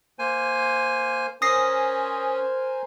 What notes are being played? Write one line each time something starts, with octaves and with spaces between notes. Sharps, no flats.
A#3 C5 G#5
C#4 A#4 C5 G#5 D#6 A#6 C7